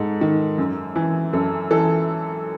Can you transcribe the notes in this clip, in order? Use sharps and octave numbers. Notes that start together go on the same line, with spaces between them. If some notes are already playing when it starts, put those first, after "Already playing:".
Already playing: G#2 A4
D#3
F#2
E3
F#2 A4
E3 A4